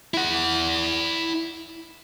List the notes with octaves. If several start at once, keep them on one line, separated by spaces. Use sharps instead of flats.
E4 F#5